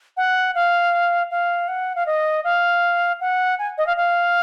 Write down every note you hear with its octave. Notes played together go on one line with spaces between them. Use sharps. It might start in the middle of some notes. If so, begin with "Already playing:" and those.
F#5
F5
F5
F#5
F5
D#5
F5
F#5
G#5
D#5
F5
F5